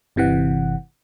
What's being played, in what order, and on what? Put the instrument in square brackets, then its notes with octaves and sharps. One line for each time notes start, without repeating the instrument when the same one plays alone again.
[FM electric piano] G1 C3 E3 F#5